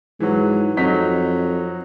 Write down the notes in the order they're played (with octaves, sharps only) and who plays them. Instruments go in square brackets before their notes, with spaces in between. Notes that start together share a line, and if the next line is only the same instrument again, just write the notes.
[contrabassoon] G#2 [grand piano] E3 F#3
[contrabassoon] F2 [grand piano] F#3 D#4 B6